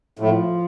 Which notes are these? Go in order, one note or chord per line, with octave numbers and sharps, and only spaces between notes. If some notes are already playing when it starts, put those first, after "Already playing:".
A2 F3